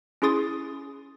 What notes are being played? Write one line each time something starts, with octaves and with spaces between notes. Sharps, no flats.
C#4 E4 G#4 C6 D#6 A6